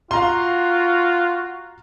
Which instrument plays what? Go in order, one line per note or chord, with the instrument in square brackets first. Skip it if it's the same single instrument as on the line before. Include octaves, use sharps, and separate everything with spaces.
[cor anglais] F4 [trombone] F#4 [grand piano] F5 A#5 C6